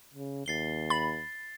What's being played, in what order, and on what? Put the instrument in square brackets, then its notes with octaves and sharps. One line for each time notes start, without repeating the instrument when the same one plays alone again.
[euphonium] C#3
[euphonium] D#2 [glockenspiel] A6 C7 G7
[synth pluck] B5 [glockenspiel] A6